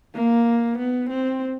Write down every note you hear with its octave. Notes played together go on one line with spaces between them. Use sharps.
A#3
B3
C4